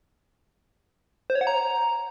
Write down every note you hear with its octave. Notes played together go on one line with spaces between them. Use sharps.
C5
C#5
F#5
A#5